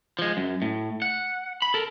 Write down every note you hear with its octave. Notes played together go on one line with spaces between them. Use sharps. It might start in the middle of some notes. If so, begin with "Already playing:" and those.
F3 G#3
F#2
A2
F#5
B5
A4 A#4